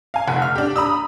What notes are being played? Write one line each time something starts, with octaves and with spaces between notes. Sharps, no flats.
F5 G#5
F1 F#5
F6
D4 G4
A#5 B5 D#6 E6